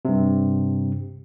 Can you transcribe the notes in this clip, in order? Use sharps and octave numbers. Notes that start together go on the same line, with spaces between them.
G2 C3